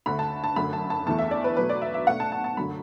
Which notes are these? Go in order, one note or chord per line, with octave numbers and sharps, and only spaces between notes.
D2 D3 A3 B5
A5
A5
F#2 D3 A3 B5
A5
A5
E2 E3 A3 A5
E5
D5
B4
B2 F#3 A3 B4
D5
E5
E5
B2 A3 F#5
A5
A5
A5
F#2 D3 F#3 A3 B5